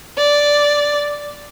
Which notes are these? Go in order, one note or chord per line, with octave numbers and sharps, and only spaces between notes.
D5